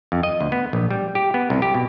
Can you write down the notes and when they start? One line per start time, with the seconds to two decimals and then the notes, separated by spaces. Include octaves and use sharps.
0.12 F2
0.23 D#5
0.41 D2
0.52 B3
0.73 A#1
0.91 G3
1.15 G4
1.34 B3
1.50 C2
1.62 G4
1.74 B2